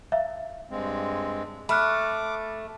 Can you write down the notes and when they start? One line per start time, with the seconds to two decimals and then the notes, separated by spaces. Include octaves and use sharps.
0.12 E5 F5
0.71 G2 G#3 C4
1.69 A3 B5 D6 F6 F#6